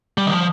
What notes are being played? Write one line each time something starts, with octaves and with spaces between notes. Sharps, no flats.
G3
D#3
F3